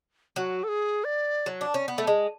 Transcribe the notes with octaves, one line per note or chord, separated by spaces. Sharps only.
F#3 F#4
A4
G#4
D5
F#3
D4
C#4
B3
A3
G#3